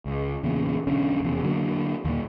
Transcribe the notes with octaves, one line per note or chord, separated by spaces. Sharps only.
C#2
E2 A#2 C#3
B1 D3 C#4
F1 E2
D3 F#3 A#3
D#2 A#2